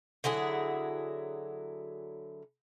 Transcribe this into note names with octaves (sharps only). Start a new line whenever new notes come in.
D3 F#3 E4 G#4